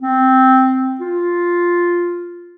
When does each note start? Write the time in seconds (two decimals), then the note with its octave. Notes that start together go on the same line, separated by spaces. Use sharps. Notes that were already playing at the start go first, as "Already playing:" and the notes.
0.02 C4
1.01 F4